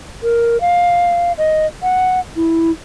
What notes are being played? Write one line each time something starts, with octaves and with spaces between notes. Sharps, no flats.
A#4
F5
D#5
F#5
E4